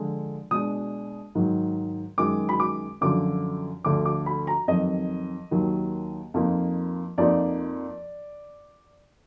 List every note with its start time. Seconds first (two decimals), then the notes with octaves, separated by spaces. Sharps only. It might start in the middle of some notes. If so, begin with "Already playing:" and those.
Already playing: D3 F3 G#3 D4
0.51 B2 G#3 D4 D#6
1.35 G#2 D#3 F#3
2.18 F#2 D#3 G#3 D6
2.49 B5
2.60 D6
3.01 F#2 D3 F3 D6
3.84 D2 D3 F3 D6
4.05 D6
4.26 B5
4.47 A#5
4.68 F2 D#3 F#3 D#5
5.51 D#2 D#3 F#3
6.34 F2 F3 A#3 D#4
7.18 F2 F3 A#3 D#4 D5